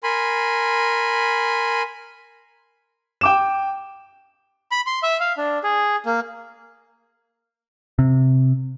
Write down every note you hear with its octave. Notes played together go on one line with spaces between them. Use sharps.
A#4 G#5 B5 C6
G5 D6 E7
B5
C6
E5
F5
D4
G#4
A#3
C3